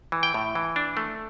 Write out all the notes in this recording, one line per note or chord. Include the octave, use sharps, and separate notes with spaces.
E3
G5
A2
E3
D4
A3